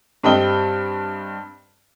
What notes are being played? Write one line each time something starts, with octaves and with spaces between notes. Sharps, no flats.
G2 G3 C4 D#5 G5 G7